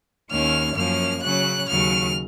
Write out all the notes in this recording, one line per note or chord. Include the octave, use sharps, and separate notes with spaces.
D#2 D#3 A#3 C#4 F6
F#2 F3 A#3 C#4 F6
C#3 F#3 C#4 F#6
D#2 C#3 F#3 F6